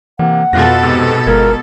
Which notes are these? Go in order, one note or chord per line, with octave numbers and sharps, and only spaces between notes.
C3 E3 A#3 F#5
F2 B2 F4 A4 F#6 A#6
G#2 C3
G1 G#3 F4 A#4 G#6